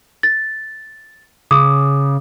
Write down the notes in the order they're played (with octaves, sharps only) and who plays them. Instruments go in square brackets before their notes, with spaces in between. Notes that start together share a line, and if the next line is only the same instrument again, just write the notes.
[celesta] A6
[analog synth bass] C#3 [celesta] D6 D#6